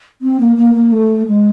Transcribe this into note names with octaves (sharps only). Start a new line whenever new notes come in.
C4
A#3
A#3
A#3
A3
G#3